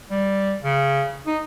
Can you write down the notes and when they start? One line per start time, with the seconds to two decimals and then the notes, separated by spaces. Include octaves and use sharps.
0.11 G3
0.63 C#3
1.27 D#4